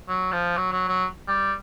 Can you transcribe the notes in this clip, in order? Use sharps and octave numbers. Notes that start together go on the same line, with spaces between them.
F#3
F3
F#3
F#3
F#3
G3